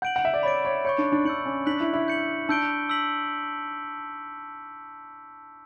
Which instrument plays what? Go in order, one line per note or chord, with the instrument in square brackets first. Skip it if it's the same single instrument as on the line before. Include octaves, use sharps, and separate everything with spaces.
[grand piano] F#5 [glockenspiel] G6 D7 F#7
[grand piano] F#5
E5
D5
[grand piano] C#5 [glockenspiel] B5 D6 A6 D7
[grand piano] C#5
[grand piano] C#5 [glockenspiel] C#6 G6 C#7
[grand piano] D4
D4
[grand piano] D4 [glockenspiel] E6 G6 C#7 F#7
[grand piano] C#4
[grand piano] D4 [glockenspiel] F#6 B6 F#7
[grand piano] E4
E4
[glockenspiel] G6 C#7 F#7
[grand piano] D4 [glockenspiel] A5 E6 G6 D7 G7
[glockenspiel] E6 B6 F#7